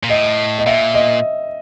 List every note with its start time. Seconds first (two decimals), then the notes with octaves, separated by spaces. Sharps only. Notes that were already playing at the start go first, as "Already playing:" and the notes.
0.03 A#2
0.09 A2 D#5
0.59 D#5
0.66 A#2 E5
0.94 D#5